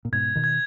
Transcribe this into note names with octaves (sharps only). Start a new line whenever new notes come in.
A#2
G#2 B2 G#6
B2 D#3
G#6